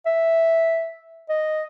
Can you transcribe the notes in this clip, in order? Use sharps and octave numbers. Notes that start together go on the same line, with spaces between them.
E5
D#5